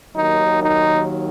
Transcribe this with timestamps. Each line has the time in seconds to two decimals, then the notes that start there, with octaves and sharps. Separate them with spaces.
0.17 D#2 D#3 F#3 D#4
0.62 D#4